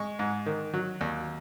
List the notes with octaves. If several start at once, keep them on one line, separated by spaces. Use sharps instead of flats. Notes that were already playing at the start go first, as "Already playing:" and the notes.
Already playing: G#3 C#6
G#2
D#3
F#3
D#2